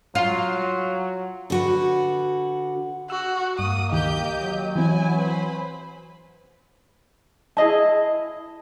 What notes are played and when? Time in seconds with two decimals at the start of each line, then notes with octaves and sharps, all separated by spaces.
0.15 F#3 F4
1.50 D3 F#4 B4
3.10 F#4 E6
3.59 G2 A#3 D#6
3.92 C#2 D#3 G4 D#5 G6
4.40 F#3
4.76 E3 C4 E4 G#5
5.17 B4 C5 B5
7.57 E4 G#4 D#5 A5